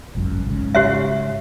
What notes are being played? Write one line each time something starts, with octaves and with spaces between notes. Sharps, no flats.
G#1 C#2 F#2
G#2 C#3
G4 C#5 E5